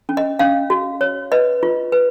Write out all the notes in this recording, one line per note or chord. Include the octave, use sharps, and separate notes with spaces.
C#4
D#5
C#4 F5
F#4
C#5
B4 D#5
F4
B4